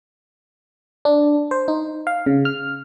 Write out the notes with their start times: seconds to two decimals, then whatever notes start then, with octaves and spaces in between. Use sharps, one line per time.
1.05 D4
1.51 C5
1.68 D#4
2.07 F5
2.26 C#3
2.45 F6